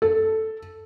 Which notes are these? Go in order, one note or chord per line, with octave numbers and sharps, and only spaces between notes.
A4